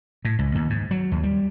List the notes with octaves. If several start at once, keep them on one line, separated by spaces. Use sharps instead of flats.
A2
C#2
D#2
G#2
F#3
D#2
G3